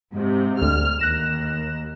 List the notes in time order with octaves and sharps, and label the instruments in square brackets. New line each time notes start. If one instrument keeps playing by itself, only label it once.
[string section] G#2 C3
[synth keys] D2 [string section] F6
[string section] D#2 [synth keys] F#6 A#6 E7